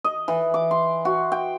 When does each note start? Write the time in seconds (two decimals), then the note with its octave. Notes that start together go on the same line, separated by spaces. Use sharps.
0.04 D#5
0.28 E3
0.54 D6
0.71 C6
1.05 F#4
1.32 G5